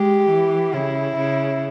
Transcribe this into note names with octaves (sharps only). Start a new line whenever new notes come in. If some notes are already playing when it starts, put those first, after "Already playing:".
Already playing: G#3 G4
E3
C#3 E4
C#3